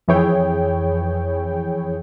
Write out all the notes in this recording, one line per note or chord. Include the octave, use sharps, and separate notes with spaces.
F2 E3 E4 G#4 C#5 G5